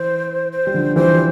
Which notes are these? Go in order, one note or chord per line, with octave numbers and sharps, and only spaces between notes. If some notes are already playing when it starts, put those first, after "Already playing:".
Already playing: E3 C5
C5
G3
D3 F3
E3 G3 C5
G3